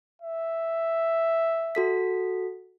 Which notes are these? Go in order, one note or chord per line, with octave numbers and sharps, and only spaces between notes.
E5
F#4 A4 B6